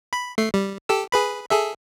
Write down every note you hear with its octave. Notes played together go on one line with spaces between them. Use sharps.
B5
A3 C7
G3
G4 A4 E6
G#4 B4 B5
G#4 A4 E5